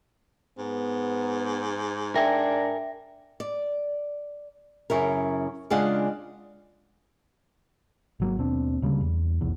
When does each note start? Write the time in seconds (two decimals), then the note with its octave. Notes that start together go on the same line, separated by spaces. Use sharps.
0.58 G#2 B3
2.15 D4 A#4 E5 G5 G#5 A#6
3.40 D5
4.90 F#2 C#3 E4 A#4
5.70 C#3 G#3 D4 F4 F5 F#5
8.20 G#1 F#3 A#3
8.39 D#2 B2 C4 D4
8.82 D2 C#3 G3 A#3
9.01 E2
9.41 F1 B1 E2